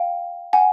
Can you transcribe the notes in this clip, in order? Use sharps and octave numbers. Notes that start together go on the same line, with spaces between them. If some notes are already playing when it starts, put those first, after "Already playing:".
Already playing: F5 G5
F#5 G#5